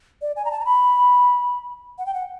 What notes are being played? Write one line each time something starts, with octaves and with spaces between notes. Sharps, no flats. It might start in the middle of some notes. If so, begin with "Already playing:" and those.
D5
G#5
A#5
A5
A#5
B5
F#5
G5
F#5